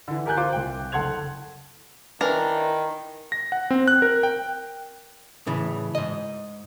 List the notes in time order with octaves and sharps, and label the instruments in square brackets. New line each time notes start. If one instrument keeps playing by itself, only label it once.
[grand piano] D3 E3
G4 A#4 G#5 F#6 G6
F4 C5 D6
C2 G5
F#1 A4 F#5 C6 G#6 F7
[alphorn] D#3 [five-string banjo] E3 D4 A#4
[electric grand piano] A#6
F#5
C4
F#6
A#4
G5
[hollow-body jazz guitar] A2 C#3 E3
G#2 D#5